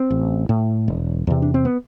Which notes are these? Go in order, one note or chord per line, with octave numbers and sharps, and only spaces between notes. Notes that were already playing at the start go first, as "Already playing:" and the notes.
Already playing: C4
A1
A2
E1
E2 C3
D4
C4
B3